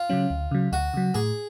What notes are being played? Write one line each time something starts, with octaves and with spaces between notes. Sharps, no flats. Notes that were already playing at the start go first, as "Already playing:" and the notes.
Already playing: F4
C#3 F#3 C#4
D2
C#3 F#3
D2 F#4
C#3 F#3
A2 G#4